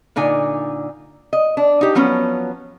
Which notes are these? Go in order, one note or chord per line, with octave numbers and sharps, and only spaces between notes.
A#2 D3 D#4 G#5
D#5
D4
D#4 G4
F3 F#3 B3 C#4